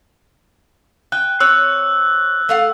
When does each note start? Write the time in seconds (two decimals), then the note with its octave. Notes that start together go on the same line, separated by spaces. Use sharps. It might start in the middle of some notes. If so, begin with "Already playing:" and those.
1.12 G5 F#6
1.40 C4 C#5 E6 F#6
2.49 A3 F5 F#5